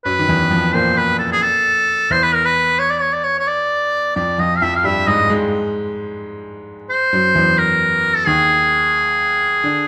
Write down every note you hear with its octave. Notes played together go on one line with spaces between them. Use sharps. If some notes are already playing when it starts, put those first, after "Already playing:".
F#2 F#3 B4
D#3
E2 E3
F2 F3
A#2 A#3 C5
B4
A4
G#4
A4
E2 E3 C5
B4
A#4
B4
C#5
D5
C#5
D5
C#5
C#5
D5
F2 F3 D5
F2 F3 D#5
F5
F2 F3 E5
F5
G2 G3 E5
G#2 G#3 D#5
G#2 G#3
C5
F#2 F#3
E2 E3
A#4
A4
D#2 D#3 G#4
D3